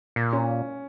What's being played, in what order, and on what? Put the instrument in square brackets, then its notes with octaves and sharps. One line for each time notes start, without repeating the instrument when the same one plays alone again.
[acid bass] A#2
[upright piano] C#4